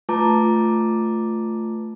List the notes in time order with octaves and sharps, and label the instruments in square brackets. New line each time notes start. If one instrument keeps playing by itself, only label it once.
[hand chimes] A3 F4 B4 A5 A#5 D6